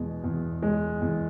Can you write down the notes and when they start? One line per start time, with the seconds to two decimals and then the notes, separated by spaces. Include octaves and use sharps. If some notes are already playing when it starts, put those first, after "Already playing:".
Already playing: E2 B2 G#3
0.24 E2
0.62 G#3
1.01 E2